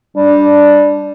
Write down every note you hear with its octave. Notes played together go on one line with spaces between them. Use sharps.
G3 D4